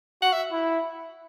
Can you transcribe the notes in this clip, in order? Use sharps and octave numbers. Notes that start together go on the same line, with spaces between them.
F#4 F#5
E5
E4